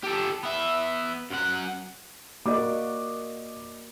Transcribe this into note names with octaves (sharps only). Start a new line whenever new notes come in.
G4 A4
B3 E5
F#2 F#5
A#3 F#4 D5 D#5 D6